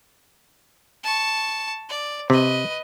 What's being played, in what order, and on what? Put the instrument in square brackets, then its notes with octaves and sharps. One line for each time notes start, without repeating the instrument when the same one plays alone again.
[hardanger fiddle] A5 C#6
D5
[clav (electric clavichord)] C3 [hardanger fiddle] B4 D#5